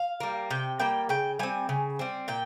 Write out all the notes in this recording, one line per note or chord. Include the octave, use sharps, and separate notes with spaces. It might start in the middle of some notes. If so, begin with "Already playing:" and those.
Already playing: F5
G3 A#3
C3 G5
G3 A#3 G5
C#3 G5
G3 C4 G#5
C#3
G3 C4
A#2 G5